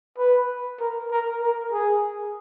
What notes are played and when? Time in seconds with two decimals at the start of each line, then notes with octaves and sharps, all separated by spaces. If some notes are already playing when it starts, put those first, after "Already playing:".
0.18 B4
0.80 A#4
1.11 A#4
1.42 A#4
1.72 G#4